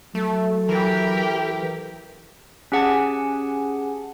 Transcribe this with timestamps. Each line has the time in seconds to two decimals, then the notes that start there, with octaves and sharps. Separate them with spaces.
0.15 F#3 A3 A4
0.69 E3 G4 A#4
2.72 C#4 G4 G#4 F#5 G#5 A5